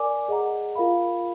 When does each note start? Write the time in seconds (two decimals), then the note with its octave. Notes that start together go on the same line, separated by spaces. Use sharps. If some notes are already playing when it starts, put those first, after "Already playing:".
Already playing: A#4 D5 G#5 D6
0.28 G#4 D#5 F#5 A#5
0.75 F4 A#4 F5 B5